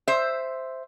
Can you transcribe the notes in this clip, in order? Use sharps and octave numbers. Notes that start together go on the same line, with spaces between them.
C5 E5